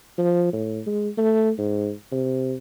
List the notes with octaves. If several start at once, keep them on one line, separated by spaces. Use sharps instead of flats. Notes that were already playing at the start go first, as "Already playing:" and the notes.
F3
A2
G#3
A3
G#2
C3